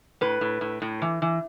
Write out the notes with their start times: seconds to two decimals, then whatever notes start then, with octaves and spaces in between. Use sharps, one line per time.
0.21 A2 B4
0.41 A2
0.61 A2
0.82 A2
1.02 E3
1.22 E3